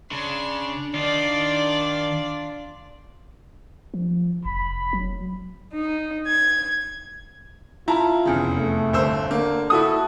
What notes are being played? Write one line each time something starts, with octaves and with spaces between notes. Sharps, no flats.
C#3 D4 C6
D#3 D4 D#4 F4 D5
F3
F1 B5
F#3
D#4
G#6
E4 F4 A5 A#5
F1 E2 C#3
A3
G1 C5 E6
D3 A#3
E4 F#4 A4 D#6